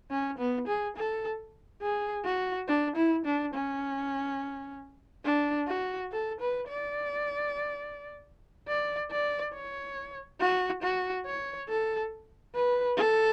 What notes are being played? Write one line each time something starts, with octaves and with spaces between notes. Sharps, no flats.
C#4
B3
G#4
A4
G#4
F#4
D4
E4
D4
C#4
D4
F#4
A4
B4
D5
D5
D5
C#5
F#4
F#4
C#5
A4
B4
A4